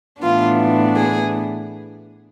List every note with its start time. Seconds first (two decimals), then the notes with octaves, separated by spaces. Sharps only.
0.22 A2 E3 B3 D4 F4
0.96 G#4